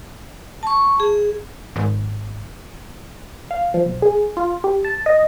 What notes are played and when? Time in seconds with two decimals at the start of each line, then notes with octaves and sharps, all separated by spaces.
0.63 A5 C#6
1.00 G#4
1.76 G#1
3.51 F5
3.74 F3
3.86 B1
4.02 G#4
4.37 F4
4.64 G4
4.85 A5
5.06 D#5